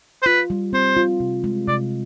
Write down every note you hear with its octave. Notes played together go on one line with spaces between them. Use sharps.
C5
F4 B4
G3
C4 C5
F4
C3
G#3
C3 D5